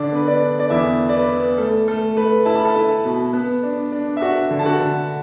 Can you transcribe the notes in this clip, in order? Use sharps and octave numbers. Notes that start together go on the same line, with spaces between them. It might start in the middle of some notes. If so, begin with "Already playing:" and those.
Already playing: D3 D4 D5
B3 B4
D4 D5
B3
D5
E2 E4 E5
B3
D5
B4
B3
A3 A4
A3 A4
A3 B4
E4 A5
B5
A4 A5
E4
B2
B3
D4
D4
E5
D4 F#4 F#5
D3
A5
F#4 F#5
D3